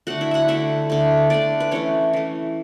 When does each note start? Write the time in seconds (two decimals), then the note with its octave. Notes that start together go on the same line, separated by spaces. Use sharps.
0.07 D3 A3 F#4 F#5
0.21 E4 E5
0.31 F#4 E5 F#5
0.48 D3 A3 E4 E5
0.90 D3 A3
1.30 D3 A3 D4 D5
1.60 B4
1.71 E3 A3 C#4 C#5
2.13 E3 A3